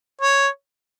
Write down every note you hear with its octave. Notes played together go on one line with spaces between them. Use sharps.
C#5